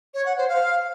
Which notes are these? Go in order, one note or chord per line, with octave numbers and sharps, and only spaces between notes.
C#5
F#5
C5
F5